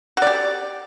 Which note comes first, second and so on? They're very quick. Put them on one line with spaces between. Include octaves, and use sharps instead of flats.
F#4 D5 G4